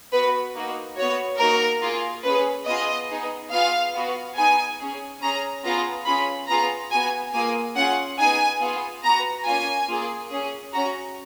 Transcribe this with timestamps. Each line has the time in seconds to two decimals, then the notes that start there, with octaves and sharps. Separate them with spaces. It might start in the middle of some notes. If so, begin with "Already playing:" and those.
0.12 B3 F#4 B4
0.56 A#3 D#4 F#4
0.97 B3 F#4 C#5
1.39 A#3 D#4 F#4 A#4
1.82 A#3 F4 G#4
2.24 C#4 G#4 B4
2.67 B3 F4 G#4 D#5
3.09 B3 D#4 G#4
3.52 B3 F4 G#4 F5
3.94 B3 F#4
4.37 B3 D#4 G#4 G#5
4.79 C#4 G#4
5.21 C#4 G#4 A#5
5.64 B3 F4 G#4 A#5
6.06 C#4 F4 G#4 B5
6.48 B3 F4 G#4 A#5
6.91 B3 F#4 G#5
7.33 A#3 F4 G#4 G#5
7.76 C#4 F4 G#4 F#5
8.18 B3 D#4 G#4 G#5
8.61 B3 F4 G#4
9.03 B3 F#4 A#5
9.45 A#3 C#4 F4 G#5
9.88 A#3 F4 G#4
10.30 C#4 G#4
10.73 C#4 F#4 A#5